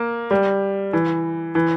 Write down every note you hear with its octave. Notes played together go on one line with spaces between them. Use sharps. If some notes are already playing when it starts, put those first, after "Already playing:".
Already playing: A#3
G3
E3
E3